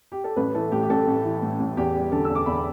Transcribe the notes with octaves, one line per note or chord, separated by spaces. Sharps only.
G4
A4
A1 B4
E3 A4
A2 G4
G4
A1 A4
A1
E3
A2
A1
E2 G4
G3
D3 A4
E2 E6
D6
E2 B5